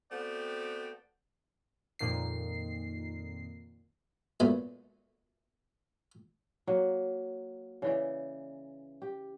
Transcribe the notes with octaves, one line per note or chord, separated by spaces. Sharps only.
A3 B3 C4 F#4 D5 G5
F2 A#2 D#3 C7
A#2 F#3 A3 B3
F#3 A#3
C#3 E3 D5
G4